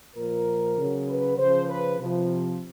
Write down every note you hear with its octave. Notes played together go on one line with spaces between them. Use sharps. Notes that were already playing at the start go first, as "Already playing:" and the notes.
A#2 F3 A#4
C#3 F#3
B4
C#3 F3 C5
B4
C3 F3